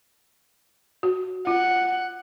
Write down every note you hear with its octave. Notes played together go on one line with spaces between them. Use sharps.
F#4
F4 F#5